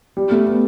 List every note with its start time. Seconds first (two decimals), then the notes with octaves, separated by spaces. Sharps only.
0.17 G3
0.31 A3
0.47 B3